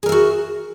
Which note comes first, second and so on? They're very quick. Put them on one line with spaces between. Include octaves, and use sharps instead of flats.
G#4 A#4 E5 F#4